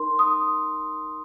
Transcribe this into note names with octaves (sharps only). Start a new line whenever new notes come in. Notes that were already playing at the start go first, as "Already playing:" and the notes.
Already playing: D#4 A#4 C6
D#6